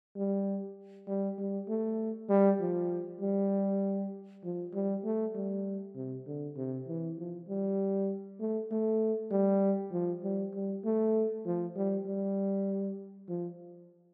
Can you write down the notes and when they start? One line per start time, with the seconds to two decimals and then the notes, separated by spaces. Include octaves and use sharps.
0.16 G3
1.08 G3
1.38 G3
1.68 A3
2.29 G3
2.60 F3
3.21 G3
4.44 F3
4.74 G3
5.04 A3
5.35 G3
5.95 C3
6.27 D3
6.56 C3
6.88 E3
7.18 F3
7.48 G3
8.40 A3
8.71 A3
9.31 G3
9.92 F3
10.23 G3
10.54 G3
10.84 A3
11.46 F3
11.76 G3
12.06 G3
13.29 F3